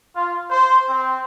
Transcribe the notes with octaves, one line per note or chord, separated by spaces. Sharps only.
F4
C5
C4